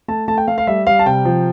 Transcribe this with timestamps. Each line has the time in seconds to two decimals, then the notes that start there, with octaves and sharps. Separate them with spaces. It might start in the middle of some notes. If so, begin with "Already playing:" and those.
0.08 A3 A5
0.28 A3 A5
0.38 G5
0.48 A3 F5
0.58 F5
0.67 G3 E5
0.87 G3 F5
0.99 A5
1.06 C3 G5
1.25 F3